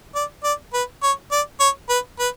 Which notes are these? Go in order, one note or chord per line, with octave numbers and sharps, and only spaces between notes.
D5
D5
B4
C#5
D5
C#5
B4
B4